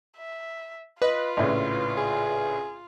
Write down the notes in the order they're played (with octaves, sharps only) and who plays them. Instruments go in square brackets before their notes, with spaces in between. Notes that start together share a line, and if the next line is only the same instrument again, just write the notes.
[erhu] E5
[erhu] F4 [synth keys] B4 [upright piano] D#5
[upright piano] A#1 A2 C#3
[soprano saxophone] G#4